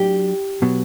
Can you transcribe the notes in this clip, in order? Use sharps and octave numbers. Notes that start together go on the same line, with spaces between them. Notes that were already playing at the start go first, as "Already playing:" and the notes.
Already playing: F#3 D4 G4
B2 F#3 B3